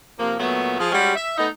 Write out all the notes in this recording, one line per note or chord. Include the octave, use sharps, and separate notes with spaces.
C3 F3 A#3
A#2 F#3 A3 B3
F3 G#4
G3 G#3 C#4 F#4 G4
E5
A3 B3 D#4